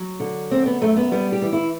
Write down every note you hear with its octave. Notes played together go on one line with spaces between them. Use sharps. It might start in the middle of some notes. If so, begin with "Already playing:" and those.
Already playing: F#3
D3
F#2 C4
B3
F#2 A3
B3
G3 B3
G4
E3
E4